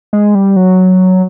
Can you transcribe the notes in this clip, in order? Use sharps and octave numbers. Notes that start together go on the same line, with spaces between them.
G#3
G3
F#3